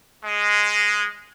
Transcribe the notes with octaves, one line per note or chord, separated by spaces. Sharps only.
G#3